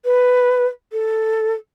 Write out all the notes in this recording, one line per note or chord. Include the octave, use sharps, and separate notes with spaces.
B4
A4